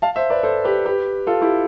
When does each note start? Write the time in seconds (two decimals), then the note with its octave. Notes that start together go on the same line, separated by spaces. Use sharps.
0.02 F5 A5
0.16 C5 E5
0.30 B4 D5
0.43 A4 C5
0.64 G4 B4
0.85 G4 B4
1.27 F4 A4
1.41 E4 G4